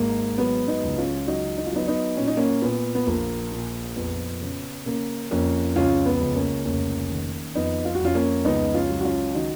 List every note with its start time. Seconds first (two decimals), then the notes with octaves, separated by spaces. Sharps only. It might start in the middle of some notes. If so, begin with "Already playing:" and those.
Already playing: G#1 G#2 A#3
0.38 F#3 B3
0.68 B3 D#4
0.83 C#2
0.98 C#4 F4
1.27 F#3 D#4 F#4
1.57 D#4
1.67 F4
1.72 F#3 B3 D#4
1.88 B3 D#4
2.17 A#2 C#4
2.27 D#4
2.37 A#3 C#4
2.62 A#2 B3
2.95 B3
3.07 A#1 A#3
3.52 A#2
3.96 F2 B3
4.42 C#3
4.86 C#3 A#3
5.31 F2 A#3 C#4
5.76 C#2 C#4 F4
6.06 B3
6.21 C#2
6.35 A#3 C#4
6.65 F1 A#3 C#4
7.11 D#3
7.55 F2 B3 D#4
7.85 F4
7.95 F#4
8.00 F2 C#4 F4
8.15 A#3 C#4
8.45 C#2 B3 D#4
8.74 C#4 F4
8.89 F#3
9.00 F#4
9.05 C#4 F4
9.34 D#3 D#4 F#4